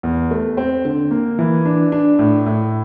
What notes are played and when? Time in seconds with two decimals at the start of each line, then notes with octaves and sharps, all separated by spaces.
0.03 E2
0.31 A3
0.57 C4
0.85 D3
1.11 A#3
1.39 E3
1.65 D4
1.92 D4
2.19 A2
2.46 A2